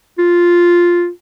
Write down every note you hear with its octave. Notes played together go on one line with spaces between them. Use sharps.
F4